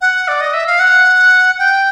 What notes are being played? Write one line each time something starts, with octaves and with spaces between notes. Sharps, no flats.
F#5
D5
D#5
E5
F5
F#5
G5